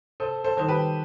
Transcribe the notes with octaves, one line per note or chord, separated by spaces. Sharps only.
C3 A4 C5
A4 C5
D#3 G3 D#4 C5
G4 B4